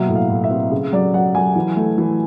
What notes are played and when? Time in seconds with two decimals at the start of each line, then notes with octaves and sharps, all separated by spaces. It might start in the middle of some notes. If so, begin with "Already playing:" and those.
Already playing: B2 F#3 A#3 E5
0.08 A2
0.15 F5
0.29 A2
0.44 E5
0.51 C4
0.71 C#3
0.93 F#3 D5
1.14 F#3 F#5
1.35 F#3 G#5
1.56 E3
1.76 A3
1.98 E3